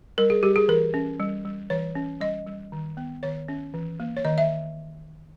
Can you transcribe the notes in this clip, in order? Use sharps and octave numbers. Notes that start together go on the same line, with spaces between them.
G3 A#4
G#4
G3 G4
G#4
E3 A#4
C#4
G3
G3
E3 C#5
C#4
G3 D#5
G3
D#3
B3
D#3 C#5
C#4
E3
A#3
C#5
D#3 D#5
E5